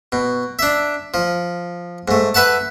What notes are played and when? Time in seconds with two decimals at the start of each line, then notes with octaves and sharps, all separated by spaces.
0.12 B2
0.59 D4 E5
1.14 F3
2.08 G#2 A3
2.34 B4 E5 F#5 A5